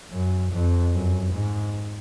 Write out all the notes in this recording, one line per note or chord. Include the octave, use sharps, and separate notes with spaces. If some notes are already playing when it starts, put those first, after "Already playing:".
F#2
F2
F#2
G#2